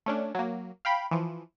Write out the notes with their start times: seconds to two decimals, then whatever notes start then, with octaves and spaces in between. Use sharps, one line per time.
0.06 A3 C#4 D4
0.35 F#3 A#3
0.85 F5 G5 B5
1.11 E3 F3